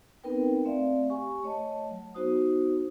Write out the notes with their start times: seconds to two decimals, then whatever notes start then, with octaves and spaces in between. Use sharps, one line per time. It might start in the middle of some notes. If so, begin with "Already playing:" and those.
0.24 B3 C4 D#4 A#4 B4 G5
0.65 A3 C4 D5 E5 F5
1.10 G4 G#5 C#6
1.43 A3 C#5 D#5 A5
1.91 F#3
2.14 B3 D#4 F#4 C5 D#6